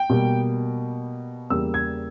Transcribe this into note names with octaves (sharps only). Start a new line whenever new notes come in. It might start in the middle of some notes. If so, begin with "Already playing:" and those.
Already playing: G5
B2 G3 A#3
E2 C#3 G3 A#3 E6
G#6